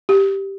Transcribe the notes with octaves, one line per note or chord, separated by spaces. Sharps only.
G4